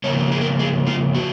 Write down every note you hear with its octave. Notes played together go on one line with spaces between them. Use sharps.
C#3 F3 A#3 C#5
G#4
A#4
G#4
F4
F#4